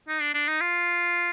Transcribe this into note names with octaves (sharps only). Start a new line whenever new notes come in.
D#4
D4
D4
D#4
F4